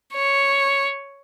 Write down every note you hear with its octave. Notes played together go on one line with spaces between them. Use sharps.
C#5